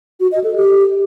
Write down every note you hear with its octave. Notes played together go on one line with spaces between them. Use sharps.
F#4
D#5
A4
G4